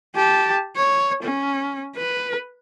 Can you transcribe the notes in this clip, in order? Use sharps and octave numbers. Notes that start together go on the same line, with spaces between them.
G4 A5
C#5
C#4
B4